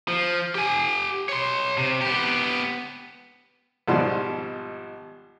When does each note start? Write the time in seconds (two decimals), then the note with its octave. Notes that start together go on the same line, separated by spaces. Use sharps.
0.08 F3
0.55 G4 G#5
1.29 C#5 C6
1.78 C3
2.01 B3 G4
3.88 G#1 G#2 B2 F3 G3 C6